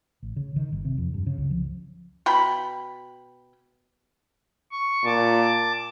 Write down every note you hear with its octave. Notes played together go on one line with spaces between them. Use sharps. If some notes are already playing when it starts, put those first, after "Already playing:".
A1
C#3
D#3
G1
C3
F2
G2
C#3
C#2
F3
B2 G5 B5
C#6
A#2 A5 D6